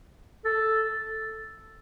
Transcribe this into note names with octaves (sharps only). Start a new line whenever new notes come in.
A4